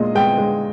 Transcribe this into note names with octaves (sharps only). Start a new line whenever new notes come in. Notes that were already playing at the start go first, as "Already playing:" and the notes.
Already playing: A#2 G#3 D#5
G#3 G5
G#3